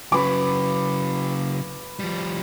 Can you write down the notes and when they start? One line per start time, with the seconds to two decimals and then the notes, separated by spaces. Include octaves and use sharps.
0.12 C#3 F#3 B4 D6
1.99 F3 G3